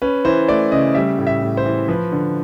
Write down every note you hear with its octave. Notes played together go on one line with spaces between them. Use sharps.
C#4 B4
E3 C5
A3 D5
C#3 D#5
G3 E5
A2
E5
A2
C5
E3
F3 B4
D3